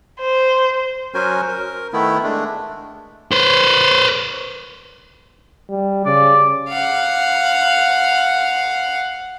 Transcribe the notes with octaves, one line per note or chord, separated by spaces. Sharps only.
C5
F#3 C#4 F#4 A#4 C5 G#5
A#4
D#3 A3 B3 E4
G#3 A3 D4
B4 C5
G3
C#3 D5
F5 F#5